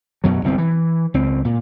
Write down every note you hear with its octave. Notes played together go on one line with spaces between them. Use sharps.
F#2 B2 F#3
G1 C2 C4
E3
C#2 C4
A#2